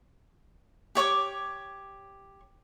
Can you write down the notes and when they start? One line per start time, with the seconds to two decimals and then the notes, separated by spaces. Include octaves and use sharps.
0.95 G4 C#5 C#6 D6